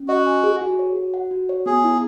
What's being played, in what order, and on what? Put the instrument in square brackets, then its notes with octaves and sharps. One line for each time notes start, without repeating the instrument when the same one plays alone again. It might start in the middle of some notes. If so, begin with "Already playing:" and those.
Already playing: [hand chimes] C#4
[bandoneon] F#4 [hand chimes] D#5
[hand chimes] G#5
G#4
F#4
C#5
F#4
F#5
F#4
C#5
[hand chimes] B3 [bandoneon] G#4
[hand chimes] E4